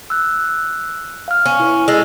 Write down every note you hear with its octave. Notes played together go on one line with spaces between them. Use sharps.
E6 F#6
F5 F6
C#4
E4 B4
G#3 A4